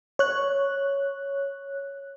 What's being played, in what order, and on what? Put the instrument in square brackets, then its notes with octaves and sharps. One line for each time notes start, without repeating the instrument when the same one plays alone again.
[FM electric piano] C#5 F#6